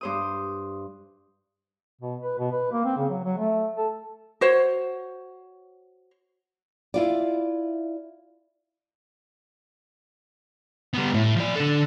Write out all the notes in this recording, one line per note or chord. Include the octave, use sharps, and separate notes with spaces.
G2 C5 D#6
B2
B4
B2
B4
A#3
C4
C#3
F#3
F#3
A3
A4
F#4 C5 C#5
E4 F4 D5
G3 B3
A2
F3 D5
D3 A4